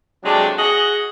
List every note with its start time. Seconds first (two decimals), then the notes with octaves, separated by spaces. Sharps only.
0.23 C3 F#3 G#3 A3 D4
0.58 F#4 G#4 D#5 F#5